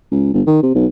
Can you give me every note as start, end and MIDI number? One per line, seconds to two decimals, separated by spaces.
0.11 0.33 37
0.33 0.42 31
0.47 0.59 51
0.63 0.72 48
0.75 0.86 35